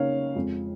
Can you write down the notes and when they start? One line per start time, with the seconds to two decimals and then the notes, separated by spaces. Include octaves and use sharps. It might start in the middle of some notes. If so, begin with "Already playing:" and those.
Already playing: C#3 A#3 D#4 C#5 F5
0.35 F2 F3 G#3